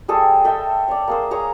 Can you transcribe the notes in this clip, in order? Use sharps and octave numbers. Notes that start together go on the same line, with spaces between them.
G3 G#4 A4 C5
A4 D#5 E5 G5
C#5 D5
A#3 G#4 C5
G#4 C#5 A#5